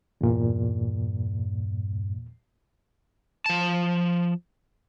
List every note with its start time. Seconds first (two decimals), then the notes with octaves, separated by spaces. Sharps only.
0.21 E2 G2 A#2
3.46 F3 A5